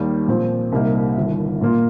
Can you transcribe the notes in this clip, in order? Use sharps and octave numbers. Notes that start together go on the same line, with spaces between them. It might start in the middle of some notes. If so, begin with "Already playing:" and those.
Already playing: D#2 D#3 G3 A#3 G4
A#2 F3 C4
C2 C3 G3 A#3 D#4
G1 G2 D#3
A#2 A#3 F4